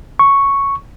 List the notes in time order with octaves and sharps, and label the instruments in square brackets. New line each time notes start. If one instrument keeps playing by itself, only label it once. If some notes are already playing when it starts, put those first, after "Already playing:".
[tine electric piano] C#6